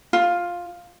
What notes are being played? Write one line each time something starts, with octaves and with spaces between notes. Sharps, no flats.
F4